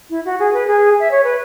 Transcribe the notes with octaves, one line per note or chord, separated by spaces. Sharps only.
E4
F#4
G#4
B4
G#4
E5
C#5
B4